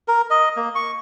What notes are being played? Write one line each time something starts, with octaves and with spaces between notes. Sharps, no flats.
A#4
D#5
A#3
C#6